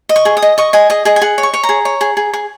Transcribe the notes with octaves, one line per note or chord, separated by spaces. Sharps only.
D#5
C#6
G#4
D#6
D#5
D#5 C#6
D#5 G#5
G#4 D#5
G#4 D#5
G#5
G#4 F#5
C#5
C#6
C#5
A#5
G#4
C#5
G#4
G#4
G#4